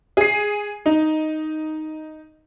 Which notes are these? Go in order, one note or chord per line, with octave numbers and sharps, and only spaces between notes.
G#4 C7
D#4